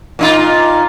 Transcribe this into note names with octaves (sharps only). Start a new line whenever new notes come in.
A#2 D#4 F4